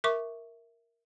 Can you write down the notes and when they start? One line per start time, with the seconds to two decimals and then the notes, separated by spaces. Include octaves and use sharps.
0.04 A#4 E5 C#6 D6